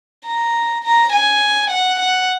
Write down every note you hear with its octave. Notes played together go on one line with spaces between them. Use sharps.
A#5
A#5
G#5
F#5
F#5